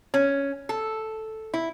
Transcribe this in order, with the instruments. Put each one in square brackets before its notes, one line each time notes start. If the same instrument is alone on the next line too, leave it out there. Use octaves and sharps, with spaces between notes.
[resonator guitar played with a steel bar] C#4
A4
E4